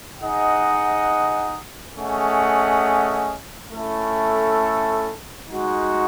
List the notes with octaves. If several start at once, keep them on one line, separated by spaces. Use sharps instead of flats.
D#4 G#4 D#5 F#5
A3 C#4 G#4 D#5 F#5
A3 C#4 E4 A4
G#3 D#4 F#4